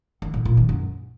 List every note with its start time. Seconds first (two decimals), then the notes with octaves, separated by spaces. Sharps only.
0.22 D#3
0.34 A2
0.45 A#2
0.57 D#3
0.69 F#2